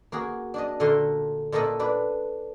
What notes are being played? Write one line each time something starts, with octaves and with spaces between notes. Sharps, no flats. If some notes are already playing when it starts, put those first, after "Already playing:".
A#3 F#4 G#4
D4 D5 D#5
A#2 D3 A3 A#4 E5 C6
A#2 A3 A#3 A4 D#5 F#5
D4 B4 D5